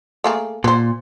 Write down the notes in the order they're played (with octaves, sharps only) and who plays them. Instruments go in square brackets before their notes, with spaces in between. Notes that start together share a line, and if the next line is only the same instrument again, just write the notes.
[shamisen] A3 A#3 G#4
[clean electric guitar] A#2 [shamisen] B4 C5